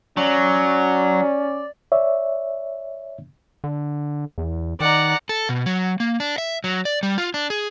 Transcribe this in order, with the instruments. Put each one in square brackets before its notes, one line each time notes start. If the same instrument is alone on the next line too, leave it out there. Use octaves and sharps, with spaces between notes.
[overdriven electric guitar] F#3 [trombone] C#4 [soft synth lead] D5
[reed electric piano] C#5 D5 E5
[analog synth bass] D3
E2
[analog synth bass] D#3 [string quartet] D5 F#5 A#5
[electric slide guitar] A4
B2
F#3
A#3
D4
E5
F#3
D5
G3
F4
D4
G#4